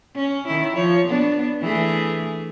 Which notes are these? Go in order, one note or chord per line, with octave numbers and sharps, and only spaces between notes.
C#4
D#3 E4
F3 C#5
B3 D4
E3 A3 G#4